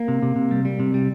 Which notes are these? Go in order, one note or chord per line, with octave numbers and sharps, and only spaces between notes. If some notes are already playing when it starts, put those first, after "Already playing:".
Already playing: A#3
C3
C3
C3
G3
G3
C3
G3